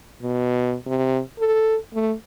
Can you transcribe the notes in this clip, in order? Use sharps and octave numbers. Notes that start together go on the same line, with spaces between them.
B2
C3
A4
A3